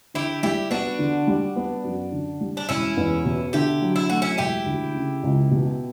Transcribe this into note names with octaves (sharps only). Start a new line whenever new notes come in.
D3 E4 G4
G3 E4 G4
B3 D4 F#4
D3
G3
B3
F#2
D3
G3
D4
E1 C#4 E4
E2
B2
D3 E4 G4
F#3
E4
A3 F#4
C#4 E4
E1 E4 G4
D2
C#3
C#2
B2